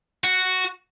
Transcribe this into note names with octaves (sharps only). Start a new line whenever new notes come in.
F#4